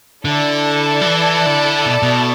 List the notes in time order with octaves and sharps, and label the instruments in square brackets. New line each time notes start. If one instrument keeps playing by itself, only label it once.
[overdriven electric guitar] D3 [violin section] E4 A4 D5 A5
[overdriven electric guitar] F#3
E3
D3
B2
B2